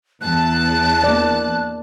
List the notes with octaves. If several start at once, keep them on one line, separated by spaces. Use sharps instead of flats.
E2 A5 F#6
A#3 D5